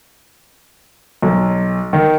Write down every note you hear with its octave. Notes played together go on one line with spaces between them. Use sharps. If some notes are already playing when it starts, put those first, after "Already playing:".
B1
D#3